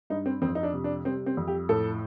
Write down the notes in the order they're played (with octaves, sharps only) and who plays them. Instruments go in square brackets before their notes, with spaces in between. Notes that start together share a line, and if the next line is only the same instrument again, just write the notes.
[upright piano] G2 D#4
C4
F2 C4
D#4
D4
C3
D4
G3 C4
C4
F2
G4
A2 A4